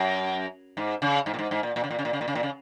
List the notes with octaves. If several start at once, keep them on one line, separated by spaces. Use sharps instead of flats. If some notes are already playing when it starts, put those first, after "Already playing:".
Already playing: F#2
G#2
C#3
G#2
A#2
G#2
G#2
A#2
A#2
C#3
A#2
C#3
A#2
C#3
A#2
C#3
A#2
C#3